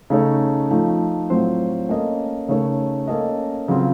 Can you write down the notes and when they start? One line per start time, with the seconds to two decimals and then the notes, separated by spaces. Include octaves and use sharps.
0.10 C#3 A3 D#4 A4 C#5
0.70 F3 A3 D#4
1.30 A2 F#3 C4 F4 C5
1.89 A#3 C#4 A4 D#5
2.48 C#3 A3 D#4 A#4 C#5
3.08 A#3 C#4 A4 D#5
3.68 C#3 F#3 C4 F4